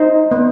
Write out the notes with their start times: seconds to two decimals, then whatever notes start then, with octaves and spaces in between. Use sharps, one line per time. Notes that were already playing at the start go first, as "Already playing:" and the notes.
Already playing: D#4 C5
0.31 B3